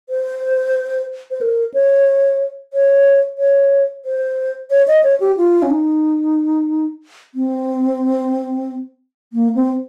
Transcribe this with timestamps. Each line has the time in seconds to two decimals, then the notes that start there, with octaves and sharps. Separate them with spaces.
0.09 C5
1.31 C5
1.41 A#4
1.74 C#5
2.73 C#5
3.38 C#5
4.05 C5
4.70 C#5
4.88 D#5
5.03 C#5
5.20 G4
5.37 F4
5.62 C#4
5.70 D#4
7.35 C4
9.33 A#3
9.55 C4